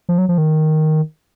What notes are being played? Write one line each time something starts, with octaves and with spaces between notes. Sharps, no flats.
F3
F#3
F3
D#3